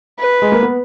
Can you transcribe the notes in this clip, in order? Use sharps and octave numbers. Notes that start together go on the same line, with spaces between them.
B4
G#3
A#3
B3